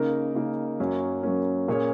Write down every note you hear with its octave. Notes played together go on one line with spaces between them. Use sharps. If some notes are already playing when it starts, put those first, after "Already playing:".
Already playing: C#3 A#3 D#4 A#4
C#3 A#3 D#4 A#4
F#2 F#3 A#3 C#4
F#2 F#3 A#3 C#4
A#2 A#3 C#4 G#4 C#5